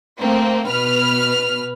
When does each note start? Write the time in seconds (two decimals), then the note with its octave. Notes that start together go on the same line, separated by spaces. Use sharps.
0.20 A3 A#3 C4
0.68 B2 B4 F6